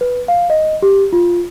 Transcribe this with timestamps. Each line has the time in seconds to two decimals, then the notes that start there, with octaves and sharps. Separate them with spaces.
0.01 B4
0.28 F5
0.50 D#5
0.82 G4
1.13 F4